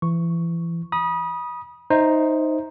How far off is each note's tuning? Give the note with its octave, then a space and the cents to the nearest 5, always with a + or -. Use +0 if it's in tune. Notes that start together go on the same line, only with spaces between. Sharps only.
E3 +30 C#6 +0
B5 -35 D#6 +0
D#4 +0 C5 +5 E5 -15